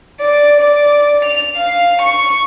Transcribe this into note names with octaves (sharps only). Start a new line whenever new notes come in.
D5
D5
F7
F5
C#6